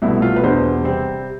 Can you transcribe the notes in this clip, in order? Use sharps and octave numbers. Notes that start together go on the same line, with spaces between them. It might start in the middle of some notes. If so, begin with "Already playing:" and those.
C2 B2 A3 E4
F4
B4
E2 B2 B3 D4 C5
C3 G3 C4